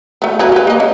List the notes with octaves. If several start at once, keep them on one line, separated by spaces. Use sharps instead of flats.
A3 B3
F#3 G#4 B4
G4 B4
A#3 D#5
C#4